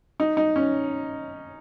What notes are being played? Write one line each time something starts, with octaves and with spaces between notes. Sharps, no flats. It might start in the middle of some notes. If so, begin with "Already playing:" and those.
D#4
D#4
C#4